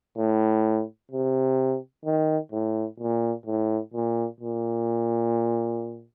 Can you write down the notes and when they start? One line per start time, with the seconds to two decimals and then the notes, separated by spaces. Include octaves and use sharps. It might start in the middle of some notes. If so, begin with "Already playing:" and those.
0.17 A2
1.11 C3
2.05 D#3
2.52 A2
3.00 A#2
3.46 A2
3.94 A#2
4.40 A#2